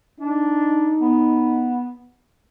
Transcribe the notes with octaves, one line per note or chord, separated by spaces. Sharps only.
D4 D#4
B3